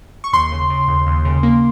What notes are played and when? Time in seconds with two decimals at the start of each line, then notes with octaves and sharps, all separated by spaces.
0.24 C#6
0.33 D#2 C6
0.52 C#3
0.70 C#3
0.88 D#2
1.07 D#2
1.25 C#3
1.43 A#3